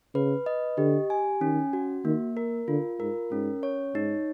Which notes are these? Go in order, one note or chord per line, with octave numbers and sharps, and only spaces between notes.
C#3 B4
D#5
D3 G4
G#5
D#3 C#4
F#4
D#3 A#3
A#4
D3 F4
G#2 A#4
G#2 C#4
C#5
G#2 D#4